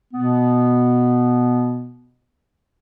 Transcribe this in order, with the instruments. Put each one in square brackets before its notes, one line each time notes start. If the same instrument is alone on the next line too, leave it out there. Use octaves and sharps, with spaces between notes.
[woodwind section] B2 B3